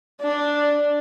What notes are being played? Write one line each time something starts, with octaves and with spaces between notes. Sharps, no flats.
D4